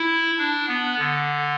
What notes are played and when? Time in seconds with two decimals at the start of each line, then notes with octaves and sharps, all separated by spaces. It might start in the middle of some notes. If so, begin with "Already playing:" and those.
Already playing: E4
0.38 D4
0.68 B3
0.98 D3